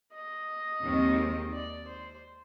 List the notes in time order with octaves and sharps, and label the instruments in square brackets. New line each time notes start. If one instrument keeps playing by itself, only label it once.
[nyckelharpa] D#5
[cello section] D#2 D#3 G#3 C4
[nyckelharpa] D5
C5